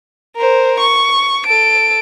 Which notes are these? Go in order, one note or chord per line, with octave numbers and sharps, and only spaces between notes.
A#4 C5
C#6
A4 D7